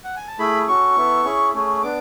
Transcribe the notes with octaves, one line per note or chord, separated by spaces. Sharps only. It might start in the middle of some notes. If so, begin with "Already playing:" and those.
F#5
G#5
A5
A3 E4 G#4 B5
C#4 F#4 A4 C#6
B3 E4 A4
C#4 E4 G#4
A3 C#4 G#4
B3 D4 D6